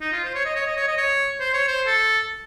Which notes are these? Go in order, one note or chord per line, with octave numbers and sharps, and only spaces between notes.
D#4
F4
C5
C#5
D#5
C#5
D#5
C#5
D#5
C#5
C5
C#5
C5
A4